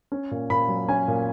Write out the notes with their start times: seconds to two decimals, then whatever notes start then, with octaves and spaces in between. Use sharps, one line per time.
0.12 C#4
0.31 A#2
0.50 A#2 B5
0.68 F#3
0.88 C#4 G#5
1.08 A#2